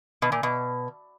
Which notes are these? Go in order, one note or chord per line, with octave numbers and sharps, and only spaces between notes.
B2
A#2
B2